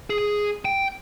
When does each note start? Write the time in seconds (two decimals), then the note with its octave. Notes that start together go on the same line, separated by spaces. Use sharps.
0.10 G#4
0.65 G5